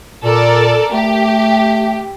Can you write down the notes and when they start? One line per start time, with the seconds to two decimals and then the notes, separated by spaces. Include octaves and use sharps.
0.24 A#2 A4 A#4 D5
0.93 A3 G4